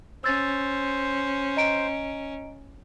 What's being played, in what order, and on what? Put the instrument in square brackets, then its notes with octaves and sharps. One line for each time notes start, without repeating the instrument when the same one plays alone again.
[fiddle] C#4 [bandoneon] C5 [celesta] E6 A6
[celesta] D#5 A#5 D7